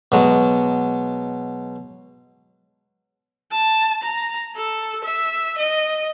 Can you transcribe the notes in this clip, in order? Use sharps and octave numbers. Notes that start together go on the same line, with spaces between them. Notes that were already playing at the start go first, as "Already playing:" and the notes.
B2 F#3 G#3
A5
A#5
A4
E5
D#5